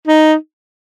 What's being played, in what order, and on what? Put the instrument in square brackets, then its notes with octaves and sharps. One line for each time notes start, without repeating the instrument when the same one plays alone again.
[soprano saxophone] D#4